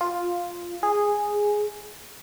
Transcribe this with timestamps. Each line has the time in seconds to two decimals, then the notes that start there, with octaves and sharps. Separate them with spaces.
0.01 F4
0.83 G#4